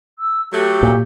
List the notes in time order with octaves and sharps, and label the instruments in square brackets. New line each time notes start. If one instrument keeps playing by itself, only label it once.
[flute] E6
[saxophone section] F#3 A3 [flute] G4
[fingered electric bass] A#2